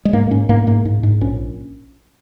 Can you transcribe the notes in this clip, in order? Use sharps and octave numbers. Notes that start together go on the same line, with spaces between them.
G#3
G#2 A#3
G#2 C#4
G#2 A#3
G#2 A#3
G#2
G#2
A#1 C#4